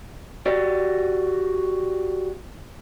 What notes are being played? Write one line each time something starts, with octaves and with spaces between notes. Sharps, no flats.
F#4 G4 D5